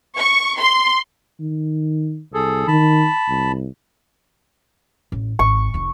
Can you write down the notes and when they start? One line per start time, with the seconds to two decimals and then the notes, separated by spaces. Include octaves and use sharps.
0.16 C#6
0.58 C6
1.40 D#3
2.34 C2 G#4 A4
2.67 D#3 A5 B5
3.29 C2
5.12 A1
5.39 G#1 C#6
5.74 F1 F2